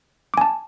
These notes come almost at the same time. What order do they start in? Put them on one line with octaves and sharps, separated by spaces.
D6 G#5 A5